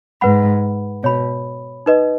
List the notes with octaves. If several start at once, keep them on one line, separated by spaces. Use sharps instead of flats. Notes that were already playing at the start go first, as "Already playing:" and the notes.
G#2 B4 F#5 B5
B2 C#5 B5
D#4 B4 D#5